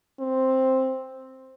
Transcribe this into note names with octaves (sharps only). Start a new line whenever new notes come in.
C4